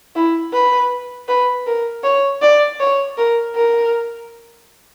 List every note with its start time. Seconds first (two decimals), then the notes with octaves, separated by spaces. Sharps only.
0.16 E4
0.53 B4
1.28 B4
1.66 A#4
2.04 C#5
2.42 D5
2.80 C#5
3.17 A#4
3.55 A#4